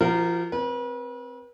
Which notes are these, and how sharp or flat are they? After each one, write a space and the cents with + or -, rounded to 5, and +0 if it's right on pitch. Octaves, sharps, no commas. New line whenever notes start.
F3 -30 F#4 +10 A#4 -15
C4 +0 B4 -40